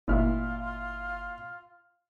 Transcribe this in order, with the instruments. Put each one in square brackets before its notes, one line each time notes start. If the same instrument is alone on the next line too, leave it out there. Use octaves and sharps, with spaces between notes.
[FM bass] G1 [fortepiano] A#2 E4 F6 [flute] F4